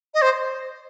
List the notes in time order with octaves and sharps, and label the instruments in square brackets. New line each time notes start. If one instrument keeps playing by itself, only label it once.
[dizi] D#5
C5